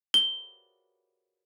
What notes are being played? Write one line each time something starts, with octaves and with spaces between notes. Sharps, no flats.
G7